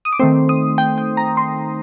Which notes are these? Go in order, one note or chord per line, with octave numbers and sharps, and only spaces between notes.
D#6
D6
D#3 A3 C4 C6
D#6
G5
G5
A#5
C6